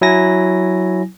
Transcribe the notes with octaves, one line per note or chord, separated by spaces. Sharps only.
F#3 E4 G#5 A#6